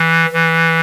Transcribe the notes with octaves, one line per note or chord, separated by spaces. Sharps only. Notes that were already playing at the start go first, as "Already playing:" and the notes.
Already playing: E3
E3